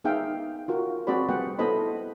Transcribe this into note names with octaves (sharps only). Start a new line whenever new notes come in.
B3 D#4 G#4 E5 F5 G5
F4 F#4 A#4
C4 F#4 G#4 C5 D5 B5
G3 B3 G#4 F#5 G5
B3 E4 A4 C5 D#5 B5